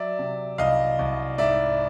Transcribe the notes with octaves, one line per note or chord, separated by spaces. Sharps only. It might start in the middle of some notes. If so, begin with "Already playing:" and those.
Already playing: F#3 D5 E5
C3
C2 D#5 F5
C2
G#2 D5 E5